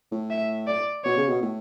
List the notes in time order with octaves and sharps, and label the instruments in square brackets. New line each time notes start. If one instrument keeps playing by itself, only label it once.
[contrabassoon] A2
[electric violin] E5
D5
[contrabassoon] B2 [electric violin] C#5
[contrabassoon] C#3
B2
A2